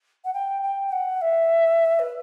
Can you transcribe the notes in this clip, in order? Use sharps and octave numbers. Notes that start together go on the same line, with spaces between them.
F#5
G5
G5
G5
F#5
E5
B4